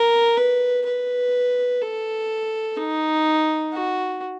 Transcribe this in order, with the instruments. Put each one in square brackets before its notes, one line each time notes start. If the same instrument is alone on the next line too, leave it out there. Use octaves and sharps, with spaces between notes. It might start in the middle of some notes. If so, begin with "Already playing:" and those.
Already playing: [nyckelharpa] A#4
B4
B4
A4
D#4
F#4